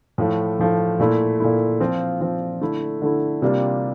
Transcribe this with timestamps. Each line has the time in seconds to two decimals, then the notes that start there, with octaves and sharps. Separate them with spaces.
0.18 A2 F3 A3
0.59 A2 F3 A3
0.99 A#2 A3 E4
1.40 A#2 A3 E4
1.80 F3 C4 F4
2.21 F3 C4 F4
2.61 D3 A3 E4
3.02 D3 A3 E4
3.42 C3 G3 A#3 D4 F4